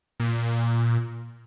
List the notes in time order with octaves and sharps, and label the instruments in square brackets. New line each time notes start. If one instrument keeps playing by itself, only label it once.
[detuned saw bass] A#2